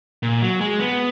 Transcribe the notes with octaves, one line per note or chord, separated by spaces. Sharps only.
A#2
F#3
G#3
B3